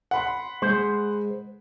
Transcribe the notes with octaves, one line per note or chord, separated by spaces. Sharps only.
F#5 B5 C6
G#3 C5